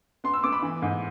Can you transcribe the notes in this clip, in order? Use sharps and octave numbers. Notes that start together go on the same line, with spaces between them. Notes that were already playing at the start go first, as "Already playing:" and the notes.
B3 C6
E6
B3 D6
B5
E3
G#2